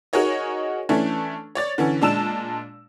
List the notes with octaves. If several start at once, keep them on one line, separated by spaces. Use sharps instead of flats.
D#4 F#4 G#4 A#4 C#5 D#5
E3 A3 C#4 D4 E4
C#5 D5 A6
D3 E3 C#4
A#2 G#3 D4 A5 E6 E7